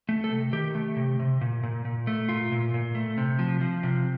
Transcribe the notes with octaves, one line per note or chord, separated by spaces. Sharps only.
A3
A4
C3
D#3 G4
A3
C3
C3
A#2
A#2
A#2
A3
A#2 F4
A#2
A#2
A3
C3
F3
F3
C3